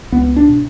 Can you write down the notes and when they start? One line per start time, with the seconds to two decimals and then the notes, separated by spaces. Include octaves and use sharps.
0.12 C#2 B3
0.36 D4
0.49 B2